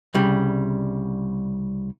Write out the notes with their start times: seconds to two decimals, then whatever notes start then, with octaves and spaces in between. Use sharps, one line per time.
0.14 C2 C#3 G3